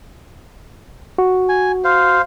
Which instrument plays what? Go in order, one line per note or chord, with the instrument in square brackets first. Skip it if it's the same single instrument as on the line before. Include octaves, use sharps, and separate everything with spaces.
[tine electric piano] F#4
[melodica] G#5
C5 F5